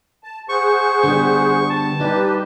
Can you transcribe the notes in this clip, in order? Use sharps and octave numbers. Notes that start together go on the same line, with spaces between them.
A5
G#4 C5 F#5 C#6
D3 G3 B3
A5
G3 D#4 G4 B4